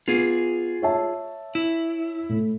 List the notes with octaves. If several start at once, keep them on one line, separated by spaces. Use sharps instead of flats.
B3 F4 G#4
C#5 E5 A5
E4
A2